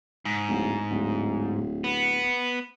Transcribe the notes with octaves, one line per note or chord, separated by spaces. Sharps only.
G#2
D1
D1
B3